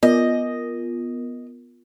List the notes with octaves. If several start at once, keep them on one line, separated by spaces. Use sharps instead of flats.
B3 F4 A#4 D#5